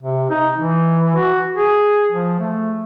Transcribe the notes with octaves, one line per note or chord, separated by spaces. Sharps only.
C3
D#4
E3
F#4
G#4
F3
A3